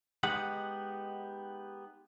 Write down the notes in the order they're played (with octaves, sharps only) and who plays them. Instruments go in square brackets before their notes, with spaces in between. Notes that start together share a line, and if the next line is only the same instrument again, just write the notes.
[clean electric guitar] G#3 B3 D#4 G4 F#5